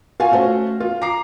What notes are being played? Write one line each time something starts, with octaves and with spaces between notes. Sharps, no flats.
F4 F#4 F5 G#5
A3 C#4 F#4 C5
F4
A#5 D6 C7